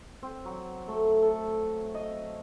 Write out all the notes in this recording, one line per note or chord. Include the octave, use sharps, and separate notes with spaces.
C4
F#3
A3
A4
D#5